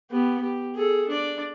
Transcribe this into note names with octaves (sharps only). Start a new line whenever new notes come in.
B3 G4
G4
G#4 A4
D4 D5